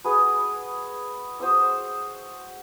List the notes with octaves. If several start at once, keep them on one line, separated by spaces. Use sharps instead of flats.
F#4 G#4 B4
F#4 C5 D#6 E6